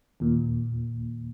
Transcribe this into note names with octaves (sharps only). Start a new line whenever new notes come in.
D#2 A#2